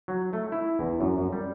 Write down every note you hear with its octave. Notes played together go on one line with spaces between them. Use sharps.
F#3
A3
E4
E2
F#2
F#2
G3